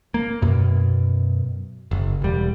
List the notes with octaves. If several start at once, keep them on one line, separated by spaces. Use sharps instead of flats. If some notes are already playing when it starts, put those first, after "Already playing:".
A#3
F#2 B2
F#1
E1 G3